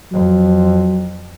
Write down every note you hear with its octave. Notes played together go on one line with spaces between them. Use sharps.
F2 F#3